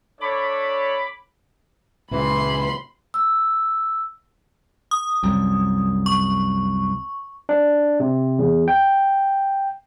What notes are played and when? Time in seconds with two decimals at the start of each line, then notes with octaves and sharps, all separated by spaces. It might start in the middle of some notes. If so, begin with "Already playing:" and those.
0.21 D4 A4 C#5 B5 D6
2.11 C#2 A#2 C#3 E3 B5 C6
3.14 E6
4.91 D#6
5.23 C2 F#2
6.06 C#6
7.49 D4
8.00 C3
8.39 E2
8.68 G5